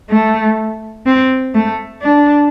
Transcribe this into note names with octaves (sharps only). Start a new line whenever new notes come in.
A3
C4
A3
D4